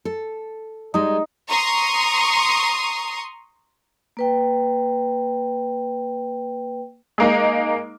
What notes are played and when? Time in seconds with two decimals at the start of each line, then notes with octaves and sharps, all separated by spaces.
0.05 A4
0.94 G3 G#3 D#4
1.50 A#5 C6 C#6 D#6
4.17 A#3 B4 G5
7.18 G#3 A#3 D#4